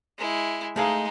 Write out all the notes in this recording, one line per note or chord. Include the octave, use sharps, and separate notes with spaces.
G#3 E4
G#3 A3 D#4 G#4 F5